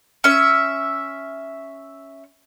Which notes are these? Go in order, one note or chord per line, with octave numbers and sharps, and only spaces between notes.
C#4 E5